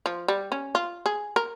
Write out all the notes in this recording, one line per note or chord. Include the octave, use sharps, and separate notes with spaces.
F3
G3
C#4
F4
G#4
A#4